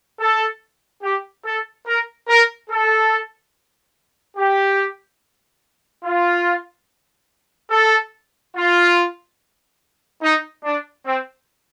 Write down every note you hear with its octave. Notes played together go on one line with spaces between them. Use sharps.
A4
G4
A4
A#4
A#4
A4
G4
F4
A4
F4
D#4
D4
C4